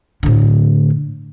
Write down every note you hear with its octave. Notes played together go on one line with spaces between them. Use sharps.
A2 D3